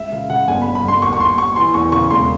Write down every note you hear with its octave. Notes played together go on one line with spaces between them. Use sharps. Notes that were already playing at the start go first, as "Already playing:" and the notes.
Already playing: C#2 E5
C#3 F5
C#3 F#5
G1 G#5
G1 B5
B5
G1 C6
D#2 C#6
C#6
D#2 C6
D#2 C#6
E3 C6
E2 C#6
C#3 C#6
E1 C6